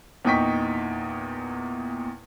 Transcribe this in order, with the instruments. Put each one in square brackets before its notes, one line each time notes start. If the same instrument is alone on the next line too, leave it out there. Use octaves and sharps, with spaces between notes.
[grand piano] E2 A#2 D#4 G5 C#6 B6